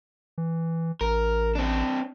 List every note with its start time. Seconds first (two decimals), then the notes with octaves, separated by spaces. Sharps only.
0.38 E3
1.01 A1 A#4
1.55 C4 D4